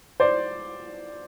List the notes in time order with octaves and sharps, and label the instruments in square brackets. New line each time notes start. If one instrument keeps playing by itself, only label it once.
[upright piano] C5 D5